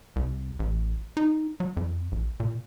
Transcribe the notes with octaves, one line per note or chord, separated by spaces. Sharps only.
C2
A1
D#4
F#3
F2
A#1
A#2